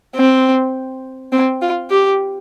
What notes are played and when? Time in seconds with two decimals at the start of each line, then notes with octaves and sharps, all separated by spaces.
0.16 C4
1.32 C4
1.62 F4
1.90 G4